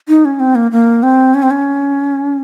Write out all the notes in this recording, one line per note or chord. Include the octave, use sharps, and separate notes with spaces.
D#4
C#4
C4
A#3
A#3
C4
C#4
C4
C#4